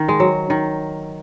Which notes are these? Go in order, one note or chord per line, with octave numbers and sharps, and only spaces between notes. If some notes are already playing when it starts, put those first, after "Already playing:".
Already playing: D#3
G#3
F#3
D#3